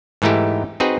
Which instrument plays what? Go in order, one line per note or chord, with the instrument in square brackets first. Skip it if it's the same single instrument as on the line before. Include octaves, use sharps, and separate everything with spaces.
[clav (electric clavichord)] G#2 E3 A3 D#4 E4 G4
C4 D#4 F#4 G#4 B4